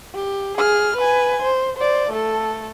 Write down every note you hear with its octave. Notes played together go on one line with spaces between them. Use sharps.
G4
G#4 F6
B4 G#5
C5
C5 D5
A3 A4